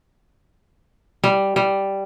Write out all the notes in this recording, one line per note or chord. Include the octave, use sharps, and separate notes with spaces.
G3
G3